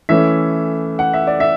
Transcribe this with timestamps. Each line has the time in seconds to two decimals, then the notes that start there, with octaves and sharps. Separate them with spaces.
0.09 E3 A3 C#4 E5
0.99 F#5
1.14 E5
1.27 D5
1.40 E5